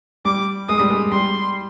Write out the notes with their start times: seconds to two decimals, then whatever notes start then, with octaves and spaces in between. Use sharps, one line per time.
0.25 G3 D6
0.69 G#3 D#6
0.79 G3
0.90 G#3
1.12 G3 C6